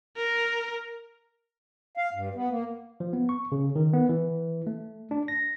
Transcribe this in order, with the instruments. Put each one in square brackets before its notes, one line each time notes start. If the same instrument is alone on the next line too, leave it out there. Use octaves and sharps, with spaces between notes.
[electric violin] A#4
[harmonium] F5
G2
B3
A#3
[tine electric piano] F3
B3
C#6
C#3
D#3
B3
E3
A3
D4
A#6